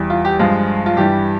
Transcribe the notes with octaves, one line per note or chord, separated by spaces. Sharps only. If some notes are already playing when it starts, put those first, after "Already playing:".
Already playing: E2 E3 G3
F4
G4
G2 F3 G#3 F4
F4
G2 E3 G3 G4